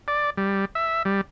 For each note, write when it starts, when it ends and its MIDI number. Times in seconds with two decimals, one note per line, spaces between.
0.08 0.30 74
0.37 0.65 55
0.75 1.03 76
1.05 1.21 55